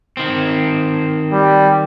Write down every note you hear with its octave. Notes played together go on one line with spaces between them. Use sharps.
D#3 C4
G3